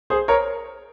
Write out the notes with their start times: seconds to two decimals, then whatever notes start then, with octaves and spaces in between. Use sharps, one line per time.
0.10 G#4 C5
0.28 A#4 C#5